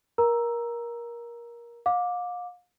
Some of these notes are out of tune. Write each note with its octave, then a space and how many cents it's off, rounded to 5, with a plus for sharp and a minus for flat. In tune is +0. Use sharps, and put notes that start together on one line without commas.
A#4 +20 A#5 +10 E6 +0
F5 +35 D6 +0